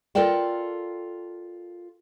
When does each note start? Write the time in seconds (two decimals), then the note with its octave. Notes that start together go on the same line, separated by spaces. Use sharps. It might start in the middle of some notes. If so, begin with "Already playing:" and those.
0.15 F4 A4 A#4 D5 G5 A5